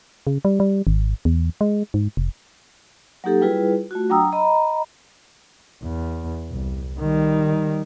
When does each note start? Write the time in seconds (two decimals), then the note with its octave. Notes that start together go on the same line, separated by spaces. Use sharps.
0.27 C#3
0.45 G3
0.60 G3
0.87 G#1
1.25 E2
1.61 G#3
1.94 G#2
2.17 F1
3.24 F#3 A#3 D#4 G4 A4
3.41 G3 E4 F4 G#4 B4
3.91 A3 F4 F#4
4.10 F#3 D4 G5 A#5 D#6 E6
4.33 D#5 A#5 B5
5.83 E2
6.50 C2
7.00 D#3 G3